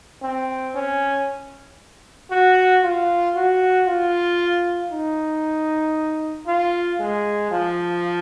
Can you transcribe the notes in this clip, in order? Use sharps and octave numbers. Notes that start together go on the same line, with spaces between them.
C4
C#4
F#4
F4
F#4
F4
D#4
F4
G#3
F3